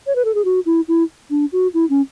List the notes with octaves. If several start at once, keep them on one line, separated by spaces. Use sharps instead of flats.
C#5
B4
A4
G#4
F#4
E4
E4
D4
F#4
E4
C#4